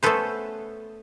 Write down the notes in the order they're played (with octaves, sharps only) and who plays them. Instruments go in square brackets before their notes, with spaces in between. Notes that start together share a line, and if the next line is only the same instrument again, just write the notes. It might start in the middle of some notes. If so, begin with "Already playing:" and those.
[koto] A3 B3 C#4 A4 B4 C5